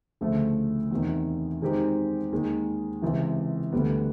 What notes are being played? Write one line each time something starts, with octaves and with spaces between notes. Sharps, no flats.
D2 C#3 F3 A3
E2 C3 D#3
D#3 G#3 C4 D#4 G4
D#2 D#3 G#3
C#2 C3 E3
D2 D3 G3 B3